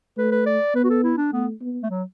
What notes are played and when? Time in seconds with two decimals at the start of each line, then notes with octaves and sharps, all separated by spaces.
0.17 A3 B4
0.32 B4
0.46 D5
0.75 B3 B4
0.84 F#4
0.90 A4
1.04 E4
1.18 D4
1.32 A3 B3
1.61 B3
1.83 A3
1.90 F#3